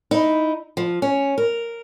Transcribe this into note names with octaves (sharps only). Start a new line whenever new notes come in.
D#4 E4
F3
C#4
A#4